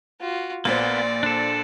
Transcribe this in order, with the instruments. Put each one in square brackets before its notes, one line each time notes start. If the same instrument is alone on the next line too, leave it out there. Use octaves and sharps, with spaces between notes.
[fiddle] F4 F#4
[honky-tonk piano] A#1 A#2 C5 [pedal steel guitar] A#3 B3 [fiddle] D5
[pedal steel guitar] D4 A4